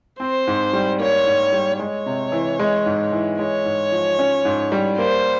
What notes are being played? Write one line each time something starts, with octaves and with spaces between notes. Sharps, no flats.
C4 C5
G#2
G3
A#3 C#5
G#2
G3
G#3 C#5
C3
E3
G#3
G#2
E3
G#3 C#5
G#2
F3
C#4
G#2
G3
A#3 C5